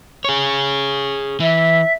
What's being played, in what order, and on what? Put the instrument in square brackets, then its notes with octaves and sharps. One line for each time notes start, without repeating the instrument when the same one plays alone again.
[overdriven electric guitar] G#4 C#5
[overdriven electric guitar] E3 [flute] E5